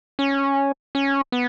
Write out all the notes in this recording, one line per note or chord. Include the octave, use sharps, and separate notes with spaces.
C#4
C#4
B3